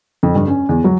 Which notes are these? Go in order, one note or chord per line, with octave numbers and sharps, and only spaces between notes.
F2
G2
C#4
E2
F#3